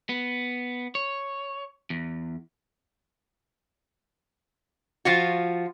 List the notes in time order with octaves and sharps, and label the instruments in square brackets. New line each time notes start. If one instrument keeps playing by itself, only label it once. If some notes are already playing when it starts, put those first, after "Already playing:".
[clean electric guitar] B3
C#5
E2
[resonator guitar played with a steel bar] F3 F4 F#4